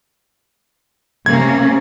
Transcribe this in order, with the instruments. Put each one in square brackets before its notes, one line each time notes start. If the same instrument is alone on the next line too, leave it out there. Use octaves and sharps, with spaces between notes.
[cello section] C3 A#3 C#4 [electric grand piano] G#6